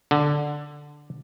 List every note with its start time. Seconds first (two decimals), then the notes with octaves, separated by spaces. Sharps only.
0.11 D3